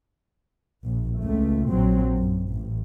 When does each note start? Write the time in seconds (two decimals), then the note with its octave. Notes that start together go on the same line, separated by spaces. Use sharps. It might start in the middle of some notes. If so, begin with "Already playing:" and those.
0.85 A#1
1.21 C#2 A3
1.70 A#1 F#3 C4
2.16 F#2
2.49 A1